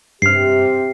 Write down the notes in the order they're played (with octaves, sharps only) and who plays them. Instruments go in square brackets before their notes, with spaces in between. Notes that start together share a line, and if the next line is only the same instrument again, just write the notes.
[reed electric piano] G2 F6 [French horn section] C3 G4 [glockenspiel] C7